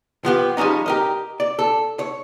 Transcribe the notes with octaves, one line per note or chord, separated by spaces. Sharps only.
F3 B3 G4
F3 G3 G#3 C#4 D#4
G4 A#4 D#5
D5
A4
C#5